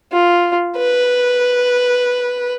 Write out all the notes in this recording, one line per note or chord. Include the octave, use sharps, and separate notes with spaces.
F4
B4